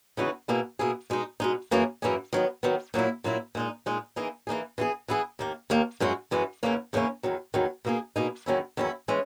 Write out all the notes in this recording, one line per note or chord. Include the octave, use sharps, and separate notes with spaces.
C#3 E3 B3 D#4 F#4
B2 A#3 E4 G#4
B2 A#3 E4 G#4
B2 G#3 D#4
B2 G#3 D#4
F#2 E3 A#3 C#4 G#4
F#2 E3 A#3 C#4 G#4
D#3 F#3 B3
D#3 F#3 B3
A#2 F#3 A#3 E4
A#2 F#3 A#3 E4
A#2 G#3 D#4
A#2 G#3 D#4
E3 A#3 D#4 G#4
E3 A#3 D#4 G#4
E3 B3 E4 G#4
E3 B3 E4 G#4
D#2 D#3 A#3
D#2 D#3 A#3
F#2 E3 G#3 C#4 F#4
F#2 E3 G#3 C#4 F#4
E2 C#3 E3 A#3 C#4
E2 C#3 E3 A#3 C#4
E2 D#3 F#3
E2 D#3 F#3
B2 A#3 D#4 G#4
B2 A#3 D#4 G#4
E2 D#3 F#3 C#4 E4
E2 D#3 F#3 C#4 E4
E3 G#3 C#4